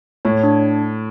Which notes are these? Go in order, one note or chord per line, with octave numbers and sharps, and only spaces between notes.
A2 C#5
D4